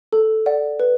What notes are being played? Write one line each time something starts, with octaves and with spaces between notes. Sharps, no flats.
A4
D5 F#5
B4